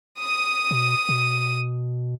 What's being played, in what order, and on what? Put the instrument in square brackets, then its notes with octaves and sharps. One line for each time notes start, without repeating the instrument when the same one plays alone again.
[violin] D#6 D#7
[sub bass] B2
B2